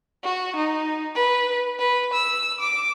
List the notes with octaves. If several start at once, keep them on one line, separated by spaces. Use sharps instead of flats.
F#4
D#4
B4
B4
E6
D6